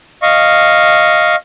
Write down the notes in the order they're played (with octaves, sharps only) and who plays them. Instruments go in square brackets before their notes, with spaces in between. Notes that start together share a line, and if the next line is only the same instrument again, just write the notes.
[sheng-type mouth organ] D#5 F5 C#6